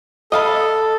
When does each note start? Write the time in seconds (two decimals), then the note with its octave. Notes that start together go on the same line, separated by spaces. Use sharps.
0.32 A4 D#5 F5 B5